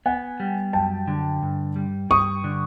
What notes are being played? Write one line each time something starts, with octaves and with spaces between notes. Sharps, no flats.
B3 F#5 G#5
G3
F#2 G5 A5
D3
G2
G3
G2 C#6 D#6
D3